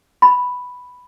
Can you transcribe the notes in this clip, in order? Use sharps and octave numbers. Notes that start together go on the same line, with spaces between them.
B5